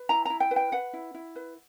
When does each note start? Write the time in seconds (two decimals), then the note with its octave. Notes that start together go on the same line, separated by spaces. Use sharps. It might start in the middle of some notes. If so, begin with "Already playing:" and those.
Already playing: B4
0.09 E4 A#5
0.25 E4 A#5
0.40 G5
0.51 B4
0.56 G5
0.72 B4 F#5
0.93 E4
1.14 E4
1.36 B4